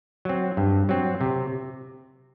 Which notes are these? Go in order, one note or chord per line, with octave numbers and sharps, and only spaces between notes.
F#3 C4
G2
F#3 C4
C3